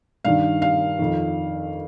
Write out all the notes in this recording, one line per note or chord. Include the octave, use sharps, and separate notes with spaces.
G2 D#3 F5
F5
F2 D#3